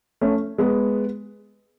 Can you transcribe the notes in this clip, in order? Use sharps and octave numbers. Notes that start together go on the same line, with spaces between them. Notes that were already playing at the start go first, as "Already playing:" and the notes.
A3 C#4
G#3 B3